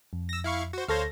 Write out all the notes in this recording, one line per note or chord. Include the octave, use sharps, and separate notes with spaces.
F2
E6 A#6
E4 F5 C#6
F#4 C5
D2 A4 C5 C#5 F5 A#6